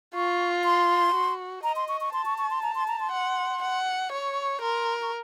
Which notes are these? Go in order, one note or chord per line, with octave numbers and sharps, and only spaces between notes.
F4 C#6
C6
F#4
D#5 A#5
C6
C#6
C#6
A5 C6
C#6
C#6
C6
A#5
C6
A#5
C6
F#5
F#5
C#5 C#6
A#4 C6
C#6